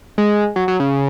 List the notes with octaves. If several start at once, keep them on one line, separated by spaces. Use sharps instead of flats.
G#3
F#3
F#3
C#3